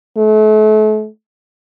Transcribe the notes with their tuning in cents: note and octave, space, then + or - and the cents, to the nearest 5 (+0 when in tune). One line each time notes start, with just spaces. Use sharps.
A3 -35